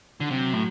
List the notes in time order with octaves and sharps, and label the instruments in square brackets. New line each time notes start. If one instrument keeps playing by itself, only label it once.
[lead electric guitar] D3
[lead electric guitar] C3 [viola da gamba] F#3
[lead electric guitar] A2